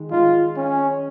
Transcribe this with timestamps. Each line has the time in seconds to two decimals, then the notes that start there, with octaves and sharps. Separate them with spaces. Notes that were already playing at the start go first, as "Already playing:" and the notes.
Already playing: D#3 G#3 D#4
0.11 D#3 G#3 D#4 F4
0.56 C#4